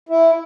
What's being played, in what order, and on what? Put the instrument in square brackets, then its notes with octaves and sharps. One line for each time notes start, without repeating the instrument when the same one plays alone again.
[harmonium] E4